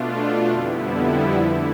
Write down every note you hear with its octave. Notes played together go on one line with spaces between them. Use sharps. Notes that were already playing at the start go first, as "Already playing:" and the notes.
Already playing: B2 A3 D4 F4
F2 D3 G3 B3 E4
D3 A3 E4